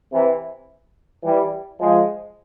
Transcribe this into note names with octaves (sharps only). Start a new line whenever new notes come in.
C3 E3
E3 G3
F3 G#3